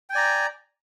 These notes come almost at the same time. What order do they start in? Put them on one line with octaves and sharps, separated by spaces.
G5 G#5 D5 A#5